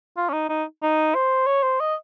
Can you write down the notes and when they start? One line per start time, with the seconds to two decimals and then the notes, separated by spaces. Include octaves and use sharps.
0.17 F4
0.29 C#4
0.33 D#4
0.49 D#4
0.83 D#4
1.15 C5
1.47 C#5
1.63 C5
1.80 D#5